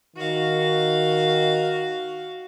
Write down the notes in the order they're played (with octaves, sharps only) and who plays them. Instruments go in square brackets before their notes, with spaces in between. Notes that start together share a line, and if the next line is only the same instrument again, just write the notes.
[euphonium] D#3 [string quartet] F#4 F5